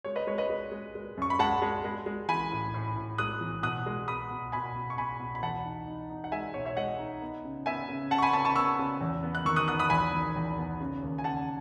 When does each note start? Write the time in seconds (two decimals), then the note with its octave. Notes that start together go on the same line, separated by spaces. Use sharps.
0.04 G#3 C#5
0.16 B4 D#5
0.27 G#3 C#5
0.38 B4 D#5
0.50 G#3
0.72 G#3
0.95 G#3
1.18 F#2 C#6
1.30 B5
1.39 G#3 F#5 A5
1.62 G#3
1.85 G#3
2.06 G#3
2.29 E3 G#5 B5
2.51 A2
2.74 A2
2.96 A2
3.18 G#3 D#6 F#6
3.41 E3
3.63 B2 D#6 F#6
3.86 G#3
4.08 B3 B5 D#6
4.30 B2
4.52 B2 G#5 B5
4.75 B2
4.90 C#6
4.98 B2 G#5 B5
5.20 B2
5.35 B5
5.42 E2 F#5 A5
5.64 D#4
5.87 D#4
6.10 D#4
6.24 F#5
6.32 G#3 E5 G#5
6.54 B2 C#5
6.65 C#5 E5
6.77 G#3 D#5 F#5
6.99 D#4
7.21 B3
7.45 C#3
7.66 B3 E5 G#5
7.88 C#3
8.11 C#3 F#5 A5
8.18 C#6
8.22 G#5 B5
8.33 C#3 A5 C#6
8.45 A5 C#6
8.55 B3 C#6 E6
8.79 C#3
9.01 E2
9.23 B3
9.35 F#6
9.45 D#3 C#6 E6
9.56 D#6 F#6
9.68 B3 D#6 F#6
9.79 B5 D#6
9.90 E2 G#5 B5
10.13 D#3
10.36 E2
10.58 B3
10.81 C#3
11.03 D#2
11.18 G#5
11.24 C#3 F#5 A5